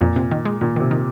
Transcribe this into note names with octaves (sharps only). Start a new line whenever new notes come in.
F2 A#2
C3
D#3
G#3
A#2 D#3
C3 D#3
D#3